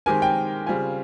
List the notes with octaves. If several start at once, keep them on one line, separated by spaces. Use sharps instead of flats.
D#3 G#3 C4 G4 A#4 G#5
G5
C#3 G3 C4 F4 G#5